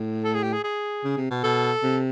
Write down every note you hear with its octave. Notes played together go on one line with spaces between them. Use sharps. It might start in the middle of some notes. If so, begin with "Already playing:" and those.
Already playing: A2
A4
G#4
G4
G#4
G#4
C#3
C3
B2
B2 A4
C3